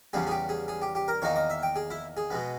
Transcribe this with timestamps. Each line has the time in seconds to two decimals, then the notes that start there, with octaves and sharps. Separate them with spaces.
0.13 E2 C#3 G3 B3 G#4
0.27 G#4
0.31 G4
0.49 G#4
0.68 G#4
0.82 G4
0.95 G4
1.08 A#4
1.22 E2 D#3 A#3 D#4 C#5
1.36 D#5
1.50 E5
1.63 G5
1.76 G#4
1.90 E4
2.17 G#4
2.30 B2 G#3 B3